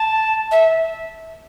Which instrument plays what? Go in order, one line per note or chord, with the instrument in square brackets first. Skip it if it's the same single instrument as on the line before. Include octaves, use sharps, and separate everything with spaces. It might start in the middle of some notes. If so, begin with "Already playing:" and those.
Already playing: [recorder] A5
E5